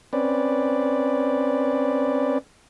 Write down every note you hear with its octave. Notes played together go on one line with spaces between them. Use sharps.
C4 C#4 B4 D5